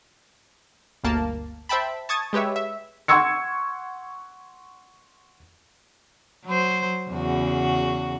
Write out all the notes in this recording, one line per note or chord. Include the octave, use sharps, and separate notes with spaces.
G1 D2 A#3 A5
C5 E5 G5 A5 B5
A5 C#6 D#6 G#6 A6
G#3 G4 B4 C#5 E5
E5
F#5 C6 C#6 E6 G#6 C#7
F#3 C5
E2 C#3 F#4